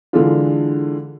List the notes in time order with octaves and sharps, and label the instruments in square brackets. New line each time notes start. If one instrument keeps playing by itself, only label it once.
[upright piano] D3 E3 G#3 D4 F4